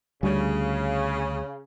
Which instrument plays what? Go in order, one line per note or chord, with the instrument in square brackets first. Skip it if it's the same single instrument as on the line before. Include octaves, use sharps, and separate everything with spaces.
[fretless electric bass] D2 G3 [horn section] C#3